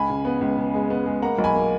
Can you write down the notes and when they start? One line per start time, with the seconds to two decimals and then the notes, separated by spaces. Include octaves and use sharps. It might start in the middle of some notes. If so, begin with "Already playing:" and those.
Already playing: C#2 G#5 B5
0.10 C#3
0.25 B3
0.41 C#2
0.58 C#3
0.74 G#3
0.90 B3
1.06 G#3
1.22 A#3 F#5 A#5
1.38 B1
1.44 G#5 B5
1.55 A#3